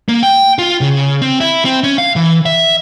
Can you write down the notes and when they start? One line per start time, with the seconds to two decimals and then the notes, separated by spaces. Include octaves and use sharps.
0.09 A#3
0.23 G5
0.58 F4
0.81 C#3
1.22 C4
1.40 E4
1.65 C4
1.84 C#4
1.98 F5
2.16 E3
2.46 E5